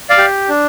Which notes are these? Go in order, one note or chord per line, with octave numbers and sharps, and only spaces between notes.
D5 F5
G4
D4